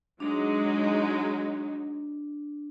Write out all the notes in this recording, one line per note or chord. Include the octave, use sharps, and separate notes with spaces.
F#3 G#3 D4 D#4